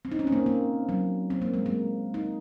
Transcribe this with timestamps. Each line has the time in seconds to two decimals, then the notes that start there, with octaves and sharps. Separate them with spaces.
0.05 C4
0.11 D#4
0.19 C#4
0.27 C4
0.32 A#3
0.46 A#3
0.89 F#3
1.30 C4
1.42 A#3
1.54 G#3
1.66 A#3
2.14 D#4